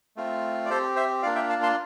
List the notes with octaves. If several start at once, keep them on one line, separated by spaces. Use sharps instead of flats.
A3 C4 F4
D5
C4 G4 A4 C5
C5 E5
A#3 D4 F4 D5 F5
E5 G5
F5 A5
A5 C6